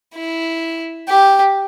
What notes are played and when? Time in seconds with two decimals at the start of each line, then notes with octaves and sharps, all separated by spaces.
0.15 E4
1.08 G4